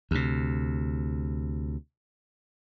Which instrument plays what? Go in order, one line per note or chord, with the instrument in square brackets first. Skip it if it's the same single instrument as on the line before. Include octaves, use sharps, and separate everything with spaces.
[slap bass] D2 C3